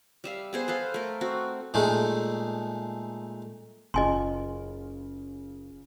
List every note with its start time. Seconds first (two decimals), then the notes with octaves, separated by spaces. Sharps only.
0.24 G3 E5 F5
0.53 B3 G#4 C5
0.68 A4 B4 C5 F5
0.94 A3 A#4
1.21 C4 F#4
1.74 A#2 G#3 A3 D#4
3.94 F#1 C#3 F4 D#5 G#5 C6